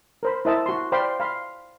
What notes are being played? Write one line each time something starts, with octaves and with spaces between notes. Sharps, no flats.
A#4 C5 B5
E4 A#4 C5 D#5 E5 A5
F#4 C6
C5 D5 F5 G5 B5 C6
F5 B5 C6